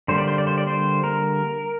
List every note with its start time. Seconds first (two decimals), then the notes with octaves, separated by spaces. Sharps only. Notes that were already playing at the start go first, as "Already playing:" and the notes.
0.08 D3 G3 A#3 C5
0.18 D5
0.28 C5
0.38 D5
0.47 C5
0.58 D5
0.67 C5
1.04 A#4